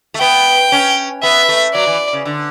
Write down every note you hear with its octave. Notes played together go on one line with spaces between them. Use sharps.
A3
B3 G5
C#4
B3 E5
A3
F#3 D5
E3
C#3
D3